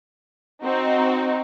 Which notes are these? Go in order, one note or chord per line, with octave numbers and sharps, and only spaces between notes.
C4 D#4 F#4